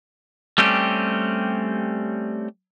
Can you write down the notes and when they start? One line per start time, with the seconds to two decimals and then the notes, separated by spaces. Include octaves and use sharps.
0.58 G3 A3 C4 C#4 G4